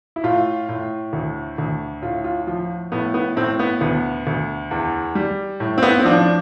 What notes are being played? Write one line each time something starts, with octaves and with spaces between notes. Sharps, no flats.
E4
A2 F4
A2
D2
D2
A2 F4
F4
F3 F4
A2 B3
B3
A2 C4
B3
D2 B3
D2
E2
G3
A2
C4
B3
C4
F3 D4
D4